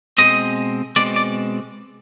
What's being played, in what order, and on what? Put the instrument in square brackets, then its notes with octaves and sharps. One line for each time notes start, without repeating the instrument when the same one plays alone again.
[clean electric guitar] B2 G#3 C4 D#5
B2 G#3 C4 D5
D5